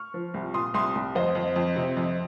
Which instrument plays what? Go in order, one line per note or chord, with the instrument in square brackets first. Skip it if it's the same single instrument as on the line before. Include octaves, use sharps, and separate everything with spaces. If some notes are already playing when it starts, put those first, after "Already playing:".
Already playing: [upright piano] C#6 F6
F3
C2
A#2 C6 D#6
C2 C6 D#6
C2
F2 C5 D#5
F2
F2
C3
F2